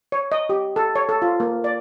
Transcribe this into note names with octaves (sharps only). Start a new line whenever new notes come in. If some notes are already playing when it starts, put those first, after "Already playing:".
C#5
D#5
G4
A4
C#5
A4
F4
A#3
D5